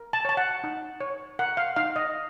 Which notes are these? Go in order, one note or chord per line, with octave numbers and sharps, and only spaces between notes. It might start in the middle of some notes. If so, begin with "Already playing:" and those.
Already playing: A#4
A5
C#5 A5
F#5
D#4
C#5
A#4 F#5
F5
D#4 F5
D#5